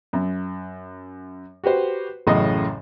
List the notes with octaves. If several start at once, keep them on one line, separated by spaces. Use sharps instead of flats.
F#2
F#4 G4 B4 C5
A1 F#2 A2 C#3 D#5